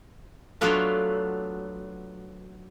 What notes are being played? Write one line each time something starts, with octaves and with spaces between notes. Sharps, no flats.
F#3 A3 B3 D4 F4 B4